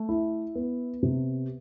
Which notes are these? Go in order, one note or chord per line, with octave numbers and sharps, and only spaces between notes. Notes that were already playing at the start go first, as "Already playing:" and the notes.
Already playing: A3
E4
B3
C3